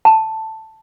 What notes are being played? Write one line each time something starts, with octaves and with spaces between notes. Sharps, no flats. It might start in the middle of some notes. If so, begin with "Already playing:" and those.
A5